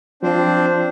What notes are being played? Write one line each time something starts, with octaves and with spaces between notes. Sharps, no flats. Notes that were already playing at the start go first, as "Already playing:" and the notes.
F3 C4 D4 C5